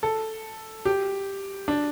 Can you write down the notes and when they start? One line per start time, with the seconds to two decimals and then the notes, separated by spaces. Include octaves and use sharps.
0.03 A4
0.85 G4
1.68 D4